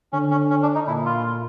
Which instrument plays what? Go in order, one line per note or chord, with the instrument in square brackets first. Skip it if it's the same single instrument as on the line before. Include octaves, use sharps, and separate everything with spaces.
[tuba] D3 [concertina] C#4
[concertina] C#4
C#4
D4
D#4
[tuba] A#2 [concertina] E4
[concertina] F4